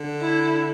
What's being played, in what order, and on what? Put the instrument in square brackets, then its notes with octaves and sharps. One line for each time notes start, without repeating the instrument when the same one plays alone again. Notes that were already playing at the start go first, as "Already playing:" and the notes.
Already playing: [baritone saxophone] D3
[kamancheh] E4